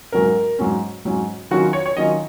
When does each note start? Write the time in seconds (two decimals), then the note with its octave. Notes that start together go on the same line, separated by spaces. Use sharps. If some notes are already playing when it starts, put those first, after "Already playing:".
0.12 G#2 F#3 C#4 A#4
0.59 G#2 F#3 C#4
1.05 G#2 F#3 C#4
1.51 D#3 F#3 C#4 F4 F#4
1.73 C#5
1.86 C#5
1.97 D#3 F#3 C#4 F4 D#5